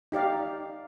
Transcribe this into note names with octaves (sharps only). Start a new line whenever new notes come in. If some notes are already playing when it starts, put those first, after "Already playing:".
D#4 G4 D5 F5